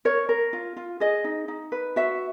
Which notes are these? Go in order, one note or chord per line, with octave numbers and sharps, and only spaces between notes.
A#4 C#5
A#4
F4
F4
G#4 D#5
D#4
D#4
B4
F#4 E5